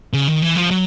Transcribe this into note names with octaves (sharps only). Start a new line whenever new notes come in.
C#3
D#3
E3
F3
F#3